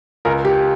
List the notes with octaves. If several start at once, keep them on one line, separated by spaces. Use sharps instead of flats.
C#2 A#4
G4